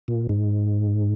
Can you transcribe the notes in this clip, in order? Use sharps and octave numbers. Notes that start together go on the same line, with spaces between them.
A#2
G#2